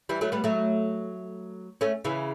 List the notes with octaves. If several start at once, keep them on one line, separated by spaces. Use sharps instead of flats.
E3 G3
F#3 A3
G3 B3
F#3 A3
A3 C#4
C#3 E3